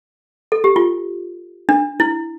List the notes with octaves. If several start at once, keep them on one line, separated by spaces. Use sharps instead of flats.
A4
G4
F4
D4
E4